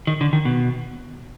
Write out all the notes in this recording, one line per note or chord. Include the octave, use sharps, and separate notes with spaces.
D#3
D3
D#3
B2